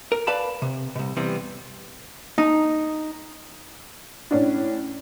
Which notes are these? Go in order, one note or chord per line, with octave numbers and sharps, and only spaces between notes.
A#4
B4 D5 F5 A5 B5
C3
C2 B2
C3 E3 G3 B3 C4
D#4
A2 C#4 D4